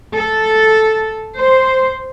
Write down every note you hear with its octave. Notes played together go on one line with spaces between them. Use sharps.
A4
C5